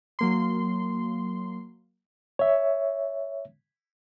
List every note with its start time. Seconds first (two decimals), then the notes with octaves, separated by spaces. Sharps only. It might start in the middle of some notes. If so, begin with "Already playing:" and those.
0.19 F#3 A#3 C6
2.39 C#5 E5